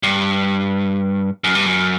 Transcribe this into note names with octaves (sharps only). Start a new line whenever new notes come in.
G2
F#2
G2
F#2